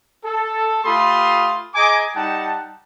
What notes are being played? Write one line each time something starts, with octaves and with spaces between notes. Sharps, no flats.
A4
A3 F4 G4 B5 C6 D#6
G#4 D#5 G#5 A#5 D6
G3 D#4 F#5 G5 A5